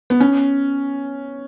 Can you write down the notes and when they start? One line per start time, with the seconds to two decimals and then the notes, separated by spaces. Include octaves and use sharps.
0.10 B3
0.20 C#4